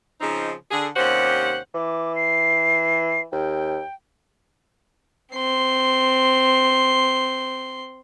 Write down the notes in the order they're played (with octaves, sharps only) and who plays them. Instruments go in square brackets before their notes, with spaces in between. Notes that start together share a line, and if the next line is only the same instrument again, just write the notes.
[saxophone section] C#3 F3 C4 D#4
D3 G#4
D#2 C3 C#4 G4 C5 F#5
[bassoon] E3 [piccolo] D6
[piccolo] C7
[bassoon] D#2 [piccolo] G5
[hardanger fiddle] C4 C6